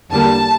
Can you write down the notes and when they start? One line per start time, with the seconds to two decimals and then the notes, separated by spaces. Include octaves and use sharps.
0.10 E2 D3 G3 A#3 A5